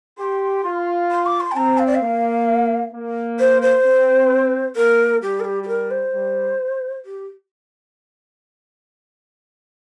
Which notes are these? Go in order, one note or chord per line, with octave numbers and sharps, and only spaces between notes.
G4 C6
F4
C6
D6
C6
G5
C4 A#5
F5
D5
F5
A#3
A#3
C5
C5
C4
A#3 A#4
G3 G4
A#4
G4
G4
A#4
C5
G3
G4